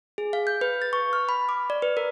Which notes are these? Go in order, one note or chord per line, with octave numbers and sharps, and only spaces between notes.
G#4
F5
G6
B4
A6
C#6
F6
B5
D6
D5
B4
A#4